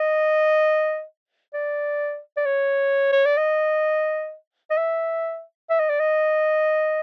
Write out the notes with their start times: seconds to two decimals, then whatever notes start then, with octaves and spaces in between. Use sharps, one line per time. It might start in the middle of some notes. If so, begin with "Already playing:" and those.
Already playing: D#5
1.54 D5
2.37 D5
2.45 C#5
3.12 C#5
3.25 D5
3.38 D#5
4.71 D#5
4.77 E5
5.70 E5
5.79 D#5
5.89 D5
6.00 D#5